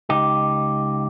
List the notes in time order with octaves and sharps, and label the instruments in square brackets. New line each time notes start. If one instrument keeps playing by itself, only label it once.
[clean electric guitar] C#2 D#4 G4